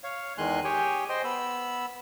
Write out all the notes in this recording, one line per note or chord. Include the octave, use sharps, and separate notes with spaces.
C#5 F5
E2 D#3 G#3 G#5 C6 F#6
G4 G#4 C#5 G5 G#5
C5 D#5 G5 C6
B3 B5 E6